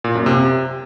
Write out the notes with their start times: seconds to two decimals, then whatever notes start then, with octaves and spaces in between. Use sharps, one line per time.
0.04 A#2
0.15 F#2
0.26 C3